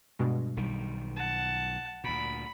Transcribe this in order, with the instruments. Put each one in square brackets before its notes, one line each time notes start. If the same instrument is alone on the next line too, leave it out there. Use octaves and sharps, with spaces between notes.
[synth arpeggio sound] G2 B2 G#3
[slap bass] B1 D#3 G3
[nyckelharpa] F#5 A5
[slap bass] D2 A#2 [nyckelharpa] B5